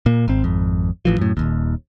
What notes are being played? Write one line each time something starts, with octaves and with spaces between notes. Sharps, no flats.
A#2 A#3
G#1 C4
G#1 F2
A1 E3 F3
F#2 A2
D#1 G#1 D#2